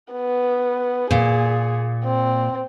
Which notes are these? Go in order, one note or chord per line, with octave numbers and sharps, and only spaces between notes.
B3
A#2 G#4
C4